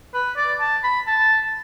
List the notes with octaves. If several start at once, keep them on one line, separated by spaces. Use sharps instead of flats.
B4
D5
A5
B5
A5